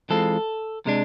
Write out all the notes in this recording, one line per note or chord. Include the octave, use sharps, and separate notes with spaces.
E3 G#3 C4 F4 A4
C3 G#3 D4